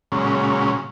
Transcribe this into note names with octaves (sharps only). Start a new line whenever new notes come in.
A#2 C#3 F#3 G#3 C#4